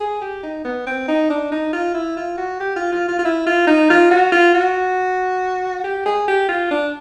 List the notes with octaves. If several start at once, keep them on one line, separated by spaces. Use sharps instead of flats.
G#4
G4
D#4
B3
C4
D#4
D4
D#4
F4
E4
F4
F#4
G4
F4
F4
F4
F4
E4
F4
D#4
F4
F#4
F4
F#4
G4
G#4
G4
F4
D4